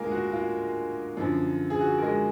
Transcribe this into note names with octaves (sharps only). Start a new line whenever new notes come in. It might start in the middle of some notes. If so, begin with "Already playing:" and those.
Already playing: D2 D3 G#3 A#3 F4 G#4 A#4
F#4
F4
F#2 D3 F3
G#4
F#4
A#4
G#3 G#4